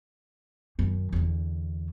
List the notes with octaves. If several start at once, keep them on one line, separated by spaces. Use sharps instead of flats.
F#2 D#3
E2 D3